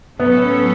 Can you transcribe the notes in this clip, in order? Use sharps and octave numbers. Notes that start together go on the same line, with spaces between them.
A2 F#3 B3 C#4 A4 C#5